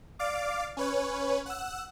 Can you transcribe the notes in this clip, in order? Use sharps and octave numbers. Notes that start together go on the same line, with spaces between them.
D5 F5 D6
C#4 B4 C#5
F#5 E6